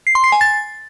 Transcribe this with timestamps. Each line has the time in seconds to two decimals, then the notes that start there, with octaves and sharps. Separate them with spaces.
0.07 C7
0.15 C6
0.24 C7
0.32 G#5
0.41 A6